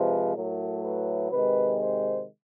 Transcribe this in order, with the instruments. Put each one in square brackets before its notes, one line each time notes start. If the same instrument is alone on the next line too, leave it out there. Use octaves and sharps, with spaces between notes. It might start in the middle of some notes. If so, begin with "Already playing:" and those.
Already playing: [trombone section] C3 F3 G#3 B4
A2 F#3 A3 A#4
B4
C3 D#3 G#3 B4
C5